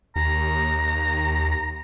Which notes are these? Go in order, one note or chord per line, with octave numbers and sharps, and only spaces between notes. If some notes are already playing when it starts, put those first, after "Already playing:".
D#2 A#5